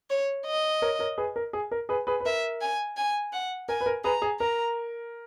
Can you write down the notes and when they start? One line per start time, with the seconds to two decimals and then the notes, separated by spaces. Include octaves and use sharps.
0.10 C#5
0.46 D#5
0.82 A#4 C#5
0.99 A#4 C#5
1.18 G#4 B4
1.36 A#4
1.53 G#4
1.71 A#4
1.89 G#4 B4
2.07 G#4 B4
2.20 B4
2.25 A#4 E5
2.61 G#5
2.97 G#5
3.33 F#5
3.69 A#4 G#5
3.81 B4
3.86 A#4
4.04 G#4 B4 A#5
4.22 G#4
4.40 A#4 A#5